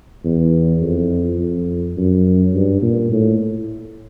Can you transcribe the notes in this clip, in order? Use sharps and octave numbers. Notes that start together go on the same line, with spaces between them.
E2
F2
F2
F#2
G2
A#2
A2